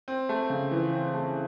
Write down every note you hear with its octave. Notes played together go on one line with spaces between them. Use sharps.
C4
A3
C#3
E3
C4
A3